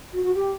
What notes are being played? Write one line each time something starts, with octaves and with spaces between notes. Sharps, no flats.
F#4
F#4
G4